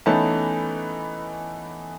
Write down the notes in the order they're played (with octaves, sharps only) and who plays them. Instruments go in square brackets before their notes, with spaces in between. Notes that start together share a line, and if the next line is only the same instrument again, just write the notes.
[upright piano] E3 A3 B3 C#4 D#4 A5